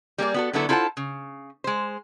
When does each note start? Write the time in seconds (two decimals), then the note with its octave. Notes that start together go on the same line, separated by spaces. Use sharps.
0.18 G3 A#3 G#4 D5
0.34 B3 F#4 A4
0.53 D3 F#3 B3 E4 A4
0.69 E4 F4 A4 C5 F#5 A5
0.97 C#3
1.64 G#3 C5